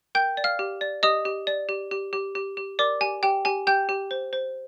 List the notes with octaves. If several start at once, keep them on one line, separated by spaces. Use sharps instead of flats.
A#4 G5 G6
D5
F5 F6
G4
D5
G4 D#5 D#6
G4
D5
G4
G4
G4
G4
G4
A#4 D5 D6
G4 G#5
G4 G5
G4 G#5
G4 G5 G6
G4
C5
C5